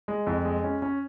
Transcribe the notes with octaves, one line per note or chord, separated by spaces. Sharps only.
G#3
F2
G#3
C#4
C#4